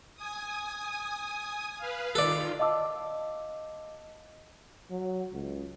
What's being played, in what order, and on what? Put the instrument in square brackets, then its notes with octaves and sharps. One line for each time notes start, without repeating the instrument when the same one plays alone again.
[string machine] G#5 D#6
B4 F5
[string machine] D#3 F4 [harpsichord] A4 D5
[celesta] D#5 F5 A5 D6 E6
[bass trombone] F#3
C#2